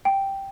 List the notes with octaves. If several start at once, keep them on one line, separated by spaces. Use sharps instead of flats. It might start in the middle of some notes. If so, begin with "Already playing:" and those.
G5